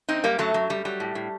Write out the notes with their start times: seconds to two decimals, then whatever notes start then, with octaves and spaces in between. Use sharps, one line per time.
0.08 F#2 C4 D#4
0.24 F#2 G3 A#3
0.38 F#2 F#3 A3
0.54 F#2 F#3
0.70 F#2 G3
0.85 F#3 G3
1.00 A2
1.15 A2